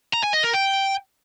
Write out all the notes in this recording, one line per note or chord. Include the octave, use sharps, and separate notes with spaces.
A#5
G#5
D#5
A#4
G5